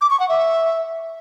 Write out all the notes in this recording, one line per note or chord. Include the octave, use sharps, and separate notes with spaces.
D6
C#6
F#5
E5